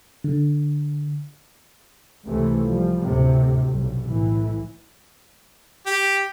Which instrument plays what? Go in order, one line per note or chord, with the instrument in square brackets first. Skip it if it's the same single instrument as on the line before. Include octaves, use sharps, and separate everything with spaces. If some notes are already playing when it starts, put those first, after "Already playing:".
[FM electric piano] D3
[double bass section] C#2 C3 E3 A3
F3 G3
D2 A2 C3
B1 G2
A2 E3
[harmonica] G4